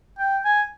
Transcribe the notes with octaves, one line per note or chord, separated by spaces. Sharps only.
G5
G#5